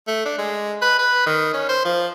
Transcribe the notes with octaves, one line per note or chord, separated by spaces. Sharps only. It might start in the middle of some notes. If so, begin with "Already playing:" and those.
A3
D4
G#3
B4
B4
D#3
C#4
C5
F3